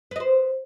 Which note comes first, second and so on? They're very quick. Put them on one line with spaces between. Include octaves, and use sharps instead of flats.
B4 D#5 C5